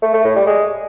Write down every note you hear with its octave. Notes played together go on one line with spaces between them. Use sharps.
A3
A3
A2
G3
G#3